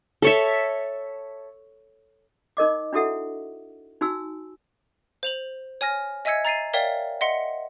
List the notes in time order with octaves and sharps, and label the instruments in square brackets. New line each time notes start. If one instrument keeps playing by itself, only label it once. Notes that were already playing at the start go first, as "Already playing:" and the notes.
[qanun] A4 C#5 E5
[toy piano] D#4 A#4 D#5 D6
D4 E4 F#4 A4 E5 F#5
D#4 F#4 G#5 E6
[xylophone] C5 F7 F#7
C#5 G#5 F6 A#6
D#5 E5 G#5 E6 G#6 C#7
A#5 A6 C7 D#7
A#4 C#5 D5 E5 F5 G5
D#5 E5 F#5 C6 C#7